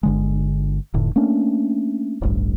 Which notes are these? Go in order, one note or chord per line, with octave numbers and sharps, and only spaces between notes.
G1 D3 G#3
F1 A2 D3
A3 A#3 C#4 D4
D1 A1 G2